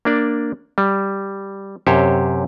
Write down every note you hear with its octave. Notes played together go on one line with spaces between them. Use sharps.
A#3 D4 D5
G3
F#2 C3 G4 C5 C#5